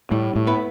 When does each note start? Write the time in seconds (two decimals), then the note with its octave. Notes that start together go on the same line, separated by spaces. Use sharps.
0.11 A2 G3
0.36 A2
0.47 B3 E4 B4